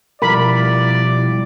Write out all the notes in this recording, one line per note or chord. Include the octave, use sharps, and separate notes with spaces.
B2 F3 G3 E4 A#4 D5 B5